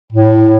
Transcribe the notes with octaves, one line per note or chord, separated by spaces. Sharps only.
A2